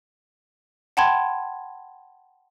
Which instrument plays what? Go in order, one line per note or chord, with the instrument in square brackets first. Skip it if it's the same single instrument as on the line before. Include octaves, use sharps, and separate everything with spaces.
[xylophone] F#5 G5 A5 B5 C6 G#6